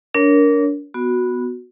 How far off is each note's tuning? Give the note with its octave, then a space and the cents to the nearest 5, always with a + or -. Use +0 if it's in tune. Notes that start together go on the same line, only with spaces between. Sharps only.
D4 -30 A#4 +0 C#5 +10
B3 +0 F#4 -10